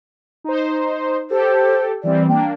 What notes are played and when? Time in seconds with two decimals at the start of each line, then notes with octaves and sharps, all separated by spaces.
0.44 D#4 C5
1.31 G4 A4 C5
2.04 E3 G3 C4 D5
2.29 A#3 D4 G5